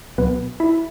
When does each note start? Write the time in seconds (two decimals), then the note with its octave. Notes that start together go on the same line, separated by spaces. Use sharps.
0.18 C#2 B2 F#3 B3 B4
0.60 E4 E5